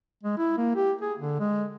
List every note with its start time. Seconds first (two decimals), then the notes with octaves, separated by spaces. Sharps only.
0.24 G#3
0.38 E4
0.58 A#3
0.76 G4
1.01 G#4
1.19 D3
1.40 G#3